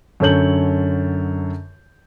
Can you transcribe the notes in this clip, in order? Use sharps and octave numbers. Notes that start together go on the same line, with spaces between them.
F#2 D3 A4 C#5 G6 F#7